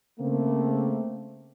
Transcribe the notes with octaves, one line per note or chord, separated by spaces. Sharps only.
C#3 A3 A#3 C4